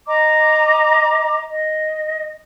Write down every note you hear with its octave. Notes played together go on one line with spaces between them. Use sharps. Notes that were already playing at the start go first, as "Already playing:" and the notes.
D#5 A#5 D6
D#5